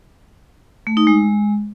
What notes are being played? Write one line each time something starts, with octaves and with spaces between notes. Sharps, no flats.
A3
D#4
G#3